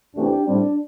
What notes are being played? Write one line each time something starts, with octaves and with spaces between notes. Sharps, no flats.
E2 C3 E3 A3 C4 D4 G4
A2 G3 C4 D4